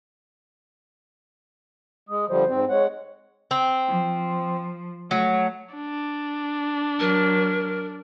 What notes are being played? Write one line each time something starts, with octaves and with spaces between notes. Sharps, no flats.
G#3 D#6
D3 F3 G3 C5
G#2 C4
G#3 C#5 F#5
C4
F3
F#3 A3
D4
F#3 A#4